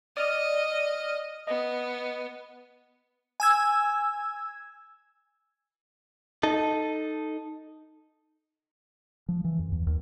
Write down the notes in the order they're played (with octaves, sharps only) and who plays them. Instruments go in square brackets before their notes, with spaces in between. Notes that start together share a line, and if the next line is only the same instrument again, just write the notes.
[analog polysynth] D5 D#6 F6 [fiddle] D#5
[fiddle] B3 [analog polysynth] D#5
[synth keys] G#5 E6 G#6
[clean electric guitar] D#4 A4
[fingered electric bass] F3
E3
F2
E2
D#2